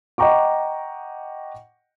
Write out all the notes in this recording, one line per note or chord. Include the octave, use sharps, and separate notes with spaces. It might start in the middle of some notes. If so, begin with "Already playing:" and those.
D#5 F#5 G5 A#5 C#6 D6